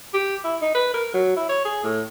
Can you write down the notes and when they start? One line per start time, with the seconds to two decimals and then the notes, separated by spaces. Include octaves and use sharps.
0.14 G4
0.44 E4
0.62 D#4
0.75 B4
0.94 A#4
1.14 F#3
1.36 E4
1.49 C#5
1.65 G#4
1.84 A2